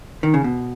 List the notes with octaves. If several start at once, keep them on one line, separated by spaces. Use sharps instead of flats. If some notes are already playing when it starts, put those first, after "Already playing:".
D#3
C#3
B2